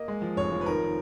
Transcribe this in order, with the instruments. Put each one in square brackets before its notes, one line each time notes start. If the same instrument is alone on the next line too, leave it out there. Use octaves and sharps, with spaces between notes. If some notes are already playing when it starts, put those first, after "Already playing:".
Already playing: [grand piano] A#3 D#5
G#3
F3
F1 C#5
F3
B4
D#3 A#4